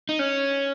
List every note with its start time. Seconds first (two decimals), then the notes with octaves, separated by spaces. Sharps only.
0.09 D#4
0.19 C#4